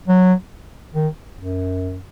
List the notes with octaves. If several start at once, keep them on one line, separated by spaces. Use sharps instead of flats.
F#3
D#3
F#2